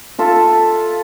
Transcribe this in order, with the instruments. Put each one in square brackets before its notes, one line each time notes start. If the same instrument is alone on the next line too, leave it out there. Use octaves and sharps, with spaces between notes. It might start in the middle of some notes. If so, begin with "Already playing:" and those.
[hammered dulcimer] F4 A4 E5